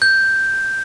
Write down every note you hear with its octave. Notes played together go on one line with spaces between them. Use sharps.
G6